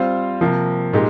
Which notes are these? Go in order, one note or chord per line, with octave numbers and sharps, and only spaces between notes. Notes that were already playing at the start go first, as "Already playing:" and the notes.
Already playing: G3 C4 F4 C5 F5
C3 F3 A#3
A#2 G#3 D#4 G4